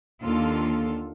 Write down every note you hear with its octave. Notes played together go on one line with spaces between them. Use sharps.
D#2 D3 F4 A4